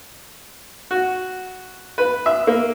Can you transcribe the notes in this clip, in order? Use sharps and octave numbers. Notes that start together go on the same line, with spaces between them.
F#4
B4
E5
A#3